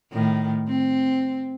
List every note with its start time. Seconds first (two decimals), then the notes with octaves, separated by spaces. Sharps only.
0.12 A2 D#3
0.68 C4